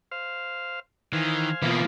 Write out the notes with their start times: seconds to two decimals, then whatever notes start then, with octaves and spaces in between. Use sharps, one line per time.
0.11 C5 F5
1.13 D#3 E3 C5 F5 G#5
1.62 B2 E3 A#3 F4